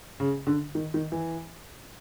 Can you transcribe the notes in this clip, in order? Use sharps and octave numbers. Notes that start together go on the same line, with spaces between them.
C#3
D3
D#3
D#3
E3